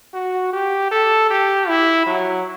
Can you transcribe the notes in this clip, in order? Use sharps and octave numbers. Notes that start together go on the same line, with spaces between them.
F#4
G4
A4
G4
E4
F#3